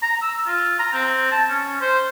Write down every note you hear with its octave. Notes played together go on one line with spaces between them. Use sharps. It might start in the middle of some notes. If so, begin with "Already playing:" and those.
A#5
E6
F4
A#5
C4
A5
C#4
C5